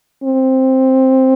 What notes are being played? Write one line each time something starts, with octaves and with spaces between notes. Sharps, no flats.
C4